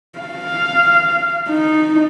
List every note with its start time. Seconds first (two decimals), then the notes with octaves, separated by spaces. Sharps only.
0.19 F5
1.49 D#4